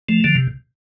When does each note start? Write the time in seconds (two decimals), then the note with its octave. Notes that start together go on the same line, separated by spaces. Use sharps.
0.09 F3 A3
0.24 D3 F3
0.35 C3